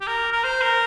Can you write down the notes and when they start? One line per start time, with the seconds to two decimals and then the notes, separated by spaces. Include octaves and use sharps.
0.01 G4
0.07 A#4
0.32 A#4
0.44 C5
0.62 A#4